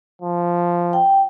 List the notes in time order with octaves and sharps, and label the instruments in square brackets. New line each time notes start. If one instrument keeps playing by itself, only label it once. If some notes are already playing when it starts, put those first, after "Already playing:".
[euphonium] F3
[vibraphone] G5